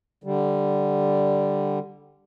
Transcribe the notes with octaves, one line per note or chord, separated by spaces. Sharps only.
D3 G3